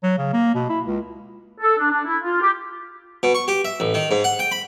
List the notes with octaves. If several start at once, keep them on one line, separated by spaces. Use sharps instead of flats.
F#3
C#3
A#3
B2
E4
C#2
A4
D4
D4
E4
F4
G4
B2
C#6
G4
E5
A1
D#3
G#2
F#5
G5
B5